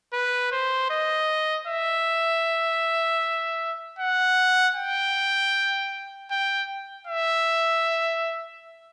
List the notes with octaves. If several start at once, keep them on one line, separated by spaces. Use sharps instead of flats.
B4
C5
D#5
E5
F#5
G5
G5
E5